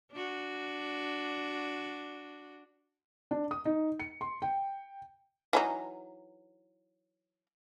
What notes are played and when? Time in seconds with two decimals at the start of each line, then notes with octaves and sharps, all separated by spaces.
0.12 D4 F#4
3.31 D4
3.51 D#6
3.65 D#4
4.00 C#7
4.21 C6
4.42 G5
5.53 E3 F#3 D#4